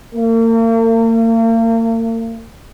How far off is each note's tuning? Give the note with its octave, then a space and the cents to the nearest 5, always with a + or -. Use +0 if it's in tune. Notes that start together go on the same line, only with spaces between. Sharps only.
A#3 -40